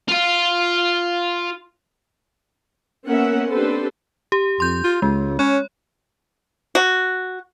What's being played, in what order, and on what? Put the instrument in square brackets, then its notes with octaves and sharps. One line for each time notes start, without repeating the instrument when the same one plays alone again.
[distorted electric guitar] F4 F5
[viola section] A#3 B3 C#4 A#4 E5 F#5
C4 D4 G4 A4 B4 C5
[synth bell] G4
[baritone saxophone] F2 [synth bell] C6 G6
[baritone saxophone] F4
[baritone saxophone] C#2 [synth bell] G#3
[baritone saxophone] C#4 [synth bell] C#5
[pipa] F#4